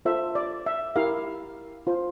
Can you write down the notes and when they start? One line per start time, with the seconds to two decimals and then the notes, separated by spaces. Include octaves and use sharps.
0.05 F4 A4 C5 E5
0.35 D5
0.66 E5
0.96 E4 G4 A#4 F5
1.87 F4 C5